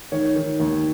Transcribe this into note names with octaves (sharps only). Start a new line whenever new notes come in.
D#3 C#5
D#3
D#2